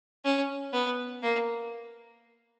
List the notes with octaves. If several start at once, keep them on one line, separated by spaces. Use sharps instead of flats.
C#4
B3
A#3